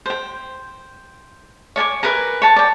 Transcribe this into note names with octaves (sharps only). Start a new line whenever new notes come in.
C5 G5
C#5 D5 G#5 D6
A#4 B4 G#5 A#5
C#5 A5
D5 G5